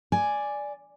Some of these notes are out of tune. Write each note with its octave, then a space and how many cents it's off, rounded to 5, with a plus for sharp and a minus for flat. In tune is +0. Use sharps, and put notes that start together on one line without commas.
D5 +0 G#5 +0